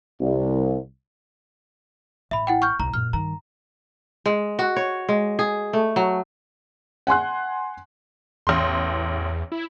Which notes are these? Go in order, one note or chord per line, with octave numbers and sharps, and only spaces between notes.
C2
A1 E5 B5
E4 F#5 G5
C#6 F6 G6
C2 E4 A#5
F#2 A#2 F6
G2 D#3 A#5
G#3
F#4
C#5
G#3
G#4
A3
F#3
F#5 G#5 C6 F#6
A1 E2 C6
E4